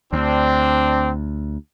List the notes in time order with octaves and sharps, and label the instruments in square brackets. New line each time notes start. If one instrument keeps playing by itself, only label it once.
[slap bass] D2 [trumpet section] C4 D4